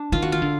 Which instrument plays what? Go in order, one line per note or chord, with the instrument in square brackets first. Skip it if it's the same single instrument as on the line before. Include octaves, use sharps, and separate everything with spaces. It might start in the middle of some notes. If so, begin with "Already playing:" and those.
Already playing: [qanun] D4
[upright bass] D#3 [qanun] F4
[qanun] F#4
F4
[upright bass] D3